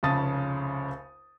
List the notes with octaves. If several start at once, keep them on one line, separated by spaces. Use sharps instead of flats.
F1 C#2 C#3 A5 D#6 A6